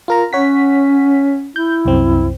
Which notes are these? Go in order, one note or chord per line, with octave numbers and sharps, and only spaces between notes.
F4 A#4 A#5
C#4 C#5 F#5 B6
E4 G6
C2 F#2 C4